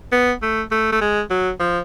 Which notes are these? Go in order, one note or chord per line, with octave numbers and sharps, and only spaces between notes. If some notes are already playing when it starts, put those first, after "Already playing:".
B3
A3
A3
A3
G#3
F#3
F3